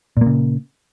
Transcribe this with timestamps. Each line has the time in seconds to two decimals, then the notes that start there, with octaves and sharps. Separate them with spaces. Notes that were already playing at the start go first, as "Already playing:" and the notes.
0.17 A#2
0.21 A#3
0.26 C#3